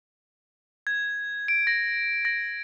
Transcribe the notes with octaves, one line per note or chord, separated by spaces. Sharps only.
G#6
D7
A#6
A#6